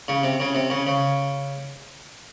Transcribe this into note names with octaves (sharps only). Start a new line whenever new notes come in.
C#3
C3
C#3
C3
C#3
C#3